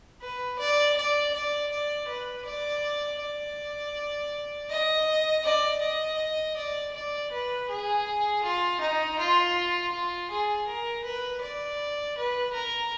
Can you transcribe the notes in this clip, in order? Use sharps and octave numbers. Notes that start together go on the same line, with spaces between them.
B4
D5
D5
D5
D5
B4
D5
D5
D#5
D5
D#5
D5
D5
B4
G#4
F4
D#4
F4
F4
G#4
A#4
B4
D5
B4
A#4